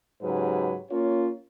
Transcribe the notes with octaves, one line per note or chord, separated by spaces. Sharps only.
G#2 C#3 F#3 G4 B4
A#3 C#4 F4 C#5